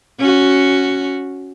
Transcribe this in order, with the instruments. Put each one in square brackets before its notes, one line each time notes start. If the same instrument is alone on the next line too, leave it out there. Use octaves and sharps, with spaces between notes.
[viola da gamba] C#4 F#4